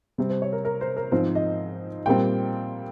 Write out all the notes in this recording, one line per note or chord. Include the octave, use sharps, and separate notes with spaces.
C3 G3 C4
C5
C#5
A#4
A#4
C5
A#4
G#2 F3 C4 C5
D#5
A#2 G3 C4 G5